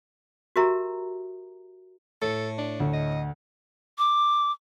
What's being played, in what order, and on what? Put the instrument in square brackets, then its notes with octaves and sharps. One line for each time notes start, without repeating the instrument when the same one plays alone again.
[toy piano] F#4 G4 A#4 E5 A#5
[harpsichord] A2 [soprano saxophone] A4
[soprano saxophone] D4
[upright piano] D2
[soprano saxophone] D#5
[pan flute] D6